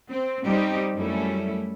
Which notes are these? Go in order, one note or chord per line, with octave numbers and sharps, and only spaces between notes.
C4
G3 C4 D#4 G4
F#2 G3 A3 C#4 E4 A4